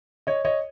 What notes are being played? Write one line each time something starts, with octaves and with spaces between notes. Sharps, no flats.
C#5 D#5
C#5 D#5